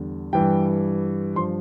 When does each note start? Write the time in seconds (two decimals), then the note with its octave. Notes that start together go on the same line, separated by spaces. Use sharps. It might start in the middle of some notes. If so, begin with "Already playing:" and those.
Already playing: E2 D3 G3
0.33 G2 E3 G3 G5
1.36 G2 F3 C6